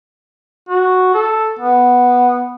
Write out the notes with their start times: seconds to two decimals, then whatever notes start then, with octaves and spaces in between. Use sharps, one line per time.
0.69 F#4
1.15 A4
1.59 B3